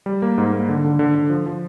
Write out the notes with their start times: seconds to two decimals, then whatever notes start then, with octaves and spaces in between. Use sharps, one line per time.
0.06 G3
0.22 A#3
0.38 G#2
0.53 A#3
0.69 D3
0.85 D3
0.99 D3
1.15 D3
1.30 F3
1.46 F3